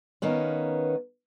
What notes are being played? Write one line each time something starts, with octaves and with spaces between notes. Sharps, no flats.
D#3 A#3 B3 C#4